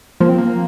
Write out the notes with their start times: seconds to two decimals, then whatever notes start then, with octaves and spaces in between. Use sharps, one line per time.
0.20 F3 A#3
0.29 C4
0.38 A#3